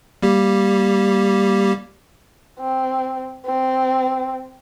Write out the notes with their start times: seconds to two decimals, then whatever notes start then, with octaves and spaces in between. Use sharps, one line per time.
0.22 G3 A#3 G4
2.60 C4
3.46 C4